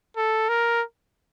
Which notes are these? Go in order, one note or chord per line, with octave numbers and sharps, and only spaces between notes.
A4
A#4